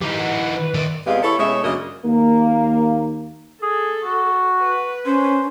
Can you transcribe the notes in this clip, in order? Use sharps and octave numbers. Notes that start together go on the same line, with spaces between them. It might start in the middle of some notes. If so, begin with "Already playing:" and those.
E3 D#4 G4
F#5
B4
D#3 D5 E5
E2 C3 G#3 B3 G4 F5
E4 A4 C#5
B2 G#3 A3 C#4 C#5 E5
F#2 C#3 A#3 D4 D#5
D#2 A#3
G#4 A4
F#4
B4
C#4 C5